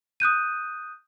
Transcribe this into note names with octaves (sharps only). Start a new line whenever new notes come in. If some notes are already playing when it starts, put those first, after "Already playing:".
D#6 F#6 G6 D#7